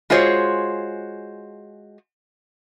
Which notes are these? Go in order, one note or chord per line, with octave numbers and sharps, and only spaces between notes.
G#3 F4 F#4 G#4 C5 C#5